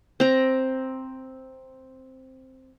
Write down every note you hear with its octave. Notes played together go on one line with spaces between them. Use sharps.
C4 A#5